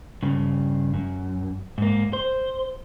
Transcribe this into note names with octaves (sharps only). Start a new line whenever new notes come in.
G2 C#3
F#2
G#2 A#3
C5